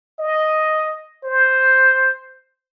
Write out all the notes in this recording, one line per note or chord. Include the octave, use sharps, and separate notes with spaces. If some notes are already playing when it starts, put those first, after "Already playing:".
D#5
C5